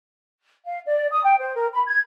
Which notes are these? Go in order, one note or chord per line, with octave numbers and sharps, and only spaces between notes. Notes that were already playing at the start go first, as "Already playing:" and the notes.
F5
D5
D#6
G5
C5
A#4
B5
G#6